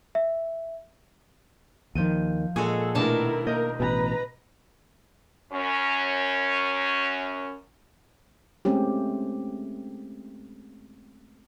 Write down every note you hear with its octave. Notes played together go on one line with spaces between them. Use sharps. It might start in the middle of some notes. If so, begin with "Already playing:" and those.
E5
D#2 D#3 F3 G6 D#7
A#2 G#3 F#4 G#4 A4
B2 D#3 A3 D4 E4 A#4 A5
A#3 A#4 D#5 G6
A1 B2 B4 A#5
F#2 C#4
G#3 A3 C4 C#4 G4